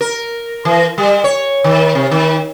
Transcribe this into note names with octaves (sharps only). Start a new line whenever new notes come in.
A#4
E3
G3
C#5
D#3
C3
D#3